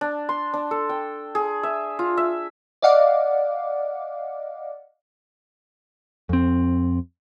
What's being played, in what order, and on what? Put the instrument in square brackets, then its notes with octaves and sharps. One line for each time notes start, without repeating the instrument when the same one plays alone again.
[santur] D4
C6
D4
A4
G5
G#4
E5
F4
E5
[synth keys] D5 D#5 F5 F#5 D6
[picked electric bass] F2 C4